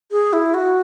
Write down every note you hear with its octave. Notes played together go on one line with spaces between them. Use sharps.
G#4
E4
F#4